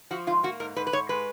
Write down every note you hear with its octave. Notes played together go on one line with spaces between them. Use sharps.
F3 F#4
G#2 F4
A#3 F#4
G#2 A#4
G#2 B4
B4
G#2 C#5
G#3 B4